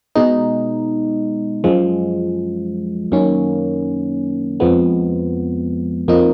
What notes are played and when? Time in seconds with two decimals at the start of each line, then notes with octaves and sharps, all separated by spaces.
0.15 B2 G#3 D#4
1.64 F#2 F3 G#3
3.12 F#2 D#3 A#3 C#4
4.60 F2 F3 G#3 B3
6.08 F2 F3 A#3 D#4